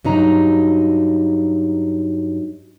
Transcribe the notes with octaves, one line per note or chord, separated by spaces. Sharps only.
G2 F#3 D#4 A#5